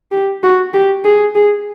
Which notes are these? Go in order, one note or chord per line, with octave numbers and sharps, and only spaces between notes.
G4
F#4
G4
G#4
G#4